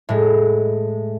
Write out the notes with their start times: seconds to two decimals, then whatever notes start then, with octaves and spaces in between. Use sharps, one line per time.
0.09 A2 G#3